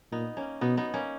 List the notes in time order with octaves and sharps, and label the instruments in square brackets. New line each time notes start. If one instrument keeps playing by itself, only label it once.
[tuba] A#2 [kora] B3 D#4
[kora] A#3 C#4
[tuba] B2 [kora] B3 D#4
[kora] B3 D#4
A#3 C#4